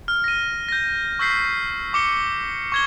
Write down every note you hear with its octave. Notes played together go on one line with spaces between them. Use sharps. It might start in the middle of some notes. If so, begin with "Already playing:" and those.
F6
A#6 D#7
G6 A#6
C#6 E6 G6 B6 C7
C#6 D6 C#7 G7
C#6 G#6 G7